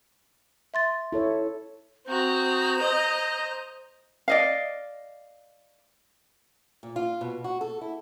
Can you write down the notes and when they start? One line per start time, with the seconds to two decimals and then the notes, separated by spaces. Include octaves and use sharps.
0.74 E5 C6 A6
1.12 E4 A4 C#5
2.07 C4 F#4 A#5 D#6 G6
2.79 C5 D#5
4.28 D5 D#5 F5
6.83 A#2
6.96 F4
7.21 B2
7.44 F#4
7.61 A4
7.81 E4